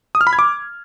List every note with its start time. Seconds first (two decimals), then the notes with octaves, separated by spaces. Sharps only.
0.15 D#6
0.21 F6
0.27 B5
0.33 G#6
0.39 D6